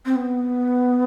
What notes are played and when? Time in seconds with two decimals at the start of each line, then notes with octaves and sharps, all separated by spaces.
0.05 C4
0.16 B3